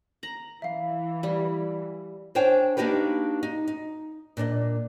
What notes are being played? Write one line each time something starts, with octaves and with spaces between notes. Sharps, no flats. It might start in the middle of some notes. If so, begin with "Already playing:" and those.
A#5 A#6 F#7
E3 E5 F5
G3
D4 C5 C#5 F5 G5 G#5
A#3 D4 D#4 F#4 G4 B4
D#4
D#4
A#2 D4 C#5 D#5